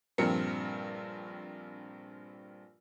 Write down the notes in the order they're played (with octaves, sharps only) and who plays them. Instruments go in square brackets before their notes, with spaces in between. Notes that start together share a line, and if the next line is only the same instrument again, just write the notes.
[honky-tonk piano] A#1 G2 C4 A#4 C#7